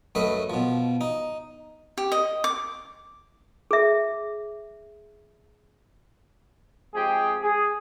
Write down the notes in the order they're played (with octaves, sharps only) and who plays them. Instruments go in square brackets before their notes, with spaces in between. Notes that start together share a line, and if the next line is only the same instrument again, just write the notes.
[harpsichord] F#2 A3 B4 D#5
B2 F3
D#4
[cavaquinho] G4
D#5
D6
[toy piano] G#4 E5
[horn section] F3 G#3 C4 G4 G#4 G#5
G#4